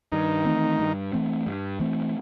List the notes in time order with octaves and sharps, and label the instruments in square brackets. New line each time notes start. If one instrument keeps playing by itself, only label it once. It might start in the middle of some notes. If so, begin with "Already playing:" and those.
[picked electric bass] G2 [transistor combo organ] D#3 D#4
[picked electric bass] E3 A3 C4
G2
E3 A3 C4
G2
E3 A3 C4